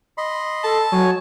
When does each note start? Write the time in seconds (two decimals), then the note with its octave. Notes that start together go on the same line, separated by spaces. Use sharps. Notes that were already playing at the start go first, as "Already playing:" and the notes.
0.18 D#5 B5 C6
0.64 A4 A5
0.92 F#3 C#5 G#5